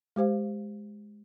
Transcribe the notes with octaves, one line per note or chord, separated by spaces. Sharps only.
G#3 G4 C5 F5